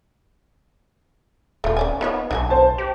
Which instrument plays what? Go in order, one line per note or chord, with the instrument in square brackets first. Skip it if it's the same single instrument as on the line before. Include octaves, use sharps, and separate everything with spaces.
[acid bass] D#1 [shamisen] A3 F4
[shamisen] C#4 D5 G#5
[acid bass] B3 [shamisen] D#4 F4 C#5
[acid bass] B1 [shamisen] D4 F#4 G#5
[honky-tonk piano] C5 A5
[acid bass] G4